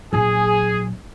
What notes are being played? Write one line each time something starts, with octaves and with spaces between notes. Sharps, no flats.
A#1 F#3 G#4